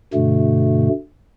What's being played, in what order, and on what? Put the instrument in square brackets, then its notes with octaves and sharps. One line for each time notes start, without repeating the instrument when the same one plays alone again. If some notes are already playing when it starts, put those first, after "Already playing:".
[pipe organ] G2 B2 D3 A3